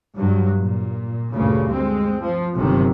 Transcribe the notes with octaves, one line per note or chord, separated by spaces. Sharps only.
G2 F#3
A#2
D2 G2 A#2 C#3
G#3 C4
F3
G1 F#2 C3 D#3